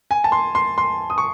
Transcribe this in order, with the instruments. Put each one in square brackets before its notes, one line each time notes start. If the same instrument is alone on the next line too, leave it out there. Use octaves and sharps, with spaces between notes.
[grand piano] G#5
A5
C6
C6
C6
D#6
C#6